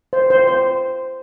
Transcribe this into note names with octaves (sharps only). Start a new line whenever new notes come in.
C5
C5
C5